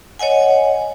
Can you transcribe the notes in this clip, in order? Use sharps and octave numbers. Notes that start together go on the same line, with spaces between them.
C#5 D#5 F#5 G#5